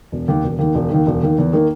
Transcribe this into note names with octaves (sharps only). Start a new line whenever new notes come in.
E1
D#2 D#3
E1
D#2 D#3
E1
D#2 D#3
E1
D#2 D#3
E2
D#3 A#3